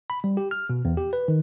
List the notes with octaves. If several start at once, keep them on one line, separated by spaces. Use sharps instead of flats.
B5
G3
G4
F6
B2
E2
G4
B4
D#3